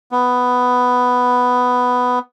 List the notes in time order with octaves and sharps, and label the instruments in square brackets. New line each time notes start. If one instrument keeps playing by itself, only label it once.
[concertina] B3